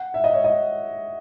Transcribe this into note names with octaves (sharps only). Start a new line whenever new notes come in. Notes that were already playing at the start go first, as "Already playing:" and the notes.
Already playing: F#5
E5
D#5
C#5
D#5